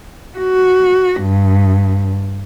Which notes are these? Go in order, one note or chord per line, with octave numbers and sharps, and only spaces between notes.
F#4
G2